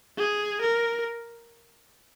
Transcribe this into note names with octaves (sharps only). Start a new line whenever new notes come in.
G#4
A#4